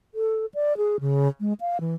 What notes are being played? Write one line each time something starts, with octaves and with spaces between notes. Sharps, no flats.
A4
D5
G#4
C#3
G#3
F5
E3